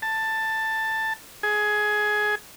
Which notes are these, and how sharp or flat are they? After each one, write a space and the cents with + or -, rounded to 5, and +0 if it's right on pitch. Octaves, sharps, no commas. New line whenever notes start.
A5 +10
G#4 +15